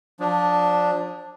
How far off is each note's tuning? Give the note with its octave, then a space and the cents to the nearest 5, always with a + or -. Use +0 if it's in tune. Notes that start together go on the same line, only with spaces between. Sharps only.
F3 +35 D4 +0